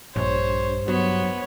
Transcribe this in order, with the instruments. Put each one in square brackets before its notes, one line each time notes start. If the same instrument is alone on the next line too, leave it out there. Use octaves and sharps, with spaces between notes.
[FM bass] A#1 [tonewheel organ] G2 [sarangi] C5 [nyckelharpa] C#5
[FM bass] F#3 [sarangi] B3 [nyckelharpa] C#5